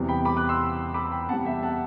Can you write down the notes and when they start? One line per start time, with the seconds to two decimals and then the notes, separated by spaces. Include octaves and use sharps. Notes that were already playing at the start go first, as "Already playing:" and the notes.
Already playing: E2 C3 E3 G3
0.08 G5 B5
0.25 B5 D6
0.37 D6 F#6
0.49 C6 E6
0.94 B5 D6
1.11 G5 B5
1.29 E2 C3 G3 F#5 A5
1.46 E5 G5
1.63 F#5 A5